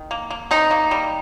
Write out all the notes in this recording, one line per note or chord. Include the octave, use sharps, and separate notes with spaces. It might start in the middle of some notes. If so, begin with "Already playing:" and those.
Already playing: D#3
A#3
A#3
C3 D#4
A#3
G3